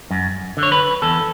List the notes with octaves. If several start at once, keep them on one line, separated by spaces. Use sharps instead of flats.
F#2
D3
C#5
B4
E2 A4